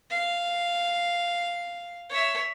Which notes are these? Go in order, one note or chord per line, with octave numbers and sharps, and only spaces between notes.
F5
C#5 E5